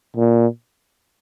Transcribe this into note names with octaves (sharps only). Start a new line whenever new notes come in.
A#2